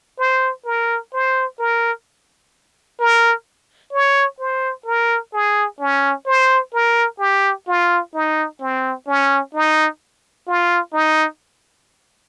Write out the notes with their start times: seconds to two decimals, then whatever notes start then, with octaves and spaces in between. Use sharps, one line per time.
0.19 C5
0.65 A#4
1.13 C5
1.59 A#4
3.00 A#4
3.93 C#5
4.40 C5
4.86 A#4
5.33 G#4
5.80 C#4
6.26 C5
6.73 A#4
7.19 G4
7.67 F4
8.14 D#4
8.60 C4
9.07 C#4
9.54 D#4
10.47 F4
10.93 D#4